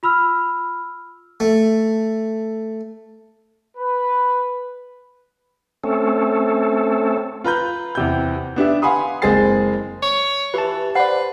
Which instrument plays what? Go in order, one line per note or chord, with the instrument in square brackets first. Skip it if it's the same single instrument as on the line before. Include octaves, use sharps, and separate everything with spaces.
[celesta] F4 B5 E6 F6
[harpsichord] A3
[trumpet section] B4
[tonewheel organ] A3 C4 C#4 A4
[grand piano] F4 B4 A#5 G6
E2 C3 G6
B3 D4 G4 E5
F5 F#5 G#5 B5 C6 D#6
F#1 G#3 C4 G#4 A6 C7
[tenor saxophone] C#5
[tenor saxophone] E3 [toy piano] G4 [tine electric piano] B4 A5
[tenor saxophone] B4 [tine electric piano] C5 D5 [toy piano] F#5